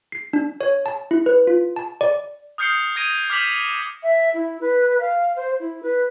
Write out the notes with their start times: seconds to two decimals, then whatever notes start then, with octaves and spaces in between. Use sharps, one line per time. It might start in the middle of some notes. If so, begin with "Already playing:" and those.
0.12 C7
0.33 D4
0.61 C#5
0.86 A5
1.11 E4
1.26 B4
1.47 F4
1.76 A5
2.01 D5
2.58 D#6 F6 G6 C7 C#7 G7
2.96 D#6 G#6 A#6 D7 D#7
3.30 D6 F6 G6 B6 F7 F#7
4.03 E5
4.34 E4
4.61 B4
5.00 F5
5.36 C5
5.60 E4
5.83 B4